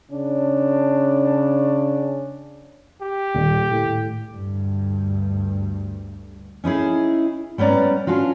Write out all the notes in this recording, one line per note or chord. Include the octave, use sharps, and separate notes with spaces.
C#3 C#4 D4
G4
D#1
A2
D2 G2
C#4 D#4 E4 G#4
G3 B3 C#4 D5 A#5
C#4 D4 F4 F#4